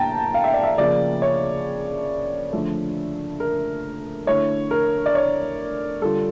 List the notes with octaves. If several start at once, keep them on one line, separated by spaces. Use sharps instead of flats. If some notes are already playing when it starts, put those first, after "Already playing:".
Already playing: A2 A#3 G5 A5 A#5
F5
E5
D5
E5
C#3 F3 A#3 D5
C#5
D3 F3 A3
A#4
D3 A3 E4 C#5
A#4
D5
C#5
D3 G3 D4 F4 A4